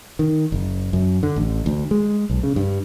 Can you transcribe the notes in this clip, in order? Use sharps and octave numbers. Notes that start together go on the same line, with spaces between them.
D#3
F#1
F#2
D3
A1
D2
G#3
B1
C#3
G2